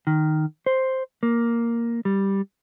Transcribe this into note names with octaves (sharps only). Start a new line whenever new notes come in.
D#3
C5
A#3
G3